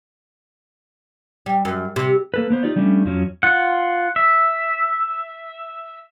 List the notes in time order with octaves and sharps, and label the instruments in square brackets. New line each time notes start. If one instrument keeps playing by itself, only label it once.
[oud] G3
F#2
C3
[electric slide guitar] A#3 A4 B4
A#3 B3 C5
D#4 F4 G4 D5
F3 G3 A3 C#4 D4
F2 F3 F#3 C#4
[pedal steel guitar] F4 F#5
E5